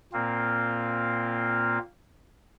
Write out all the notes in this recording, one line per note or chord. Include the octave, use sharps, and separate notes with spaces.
A#2 A#3 C4 F4